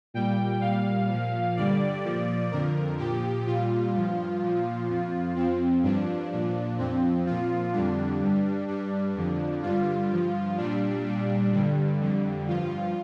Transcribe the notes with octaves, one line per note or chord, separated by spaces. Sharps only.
A#2 G3 G5
A#2 G3 F5
A#2 F3
G2 D3 G3 D5
A#2 F3
F2 D3 F3 A#4
A#2 F3 G4
A#2 G3 F4
G2 F3
A#2 F3
F2 F3
F2 F3 C4
G2 F3 D4
A#2 F3
F2 F3 C4
A#2 F3 F4
F2 D3 G3 D4
G2 G3
G2 G3 D4
F2 D3 F3
G2 D3 G3 F4
G2 F3
A#2 G3 D4
A#2 G3
G2 D3 G3
F2 D3 G3
G2 F3 F4